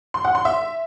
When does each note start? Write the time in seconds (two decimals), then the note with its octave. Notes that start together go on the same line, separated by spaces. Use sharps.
0.14 C6
0.25 F#5
0.35 C6
0.45 E5